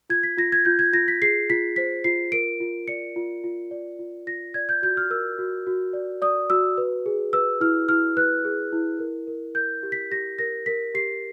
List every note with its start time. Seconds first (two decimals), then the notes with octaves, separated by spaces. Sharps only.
0.10 F4 G#6
0.23 B6
0.37 F4 A#6
0.52 G#6
0.65 F4 G6
0.79 G#6
0.93 F4 A#6
1.08 B6
1.22 G#4 C7
1.50 F4 B6
1.76 C5 B6
2.04 F4 C7
2.32 A#4 D7
2.60 F4
2.88 D5 C#7
3.16 F4
3.44 F4
3.71 D5
3.99 F4
4.27 F4 A#6
4.54 D5 G#6
4.69 G6
4.82 F#4 G6
4.97 F6
5.10 A#4 E6
5.39 F#4
5.67 F#4
5.93 D5
6.22 D5 D#6
6.50 F#4 E6
6.78 B4
7.06 G#4
7.33 B4 E6
7.60 E4 F6
7.89 E4 F6
8.17 B4 F#6
8.45 G#4
8.73 E4
8.99 A#4
9.27 A#4
9.55 A#4 G6
9.83 G4
9.92 B6
10.11 G4 A#6
10.39 A#4 A#6
10.66 A#4 B6
10.94 G4 C7